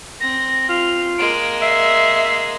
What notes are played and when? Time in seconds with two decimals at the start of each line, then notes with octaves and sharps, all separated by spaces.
0.20 C4 A#6
0.69 F4 F7
1.18 G#3 A#3 D7
1.62 E5 C7